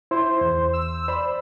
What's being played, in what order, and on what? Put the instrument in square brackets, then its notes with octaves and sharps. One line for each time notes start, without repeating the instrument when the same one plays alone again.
[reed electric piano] E4 [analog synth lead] C5
[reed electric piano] E2
[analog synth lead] E6
[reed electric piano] C5 D5 B5